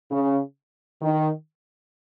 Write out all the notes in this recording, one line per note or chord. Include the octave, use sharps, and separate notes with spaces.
C#3
D#3